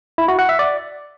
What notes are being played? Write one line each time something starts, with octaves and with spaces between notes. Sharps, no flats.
E4
F#4
F#5
E5
D5